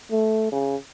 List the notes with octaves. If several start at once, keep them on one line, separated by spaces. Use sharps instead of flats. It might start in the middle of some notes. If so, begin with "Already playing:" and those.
A3
C#3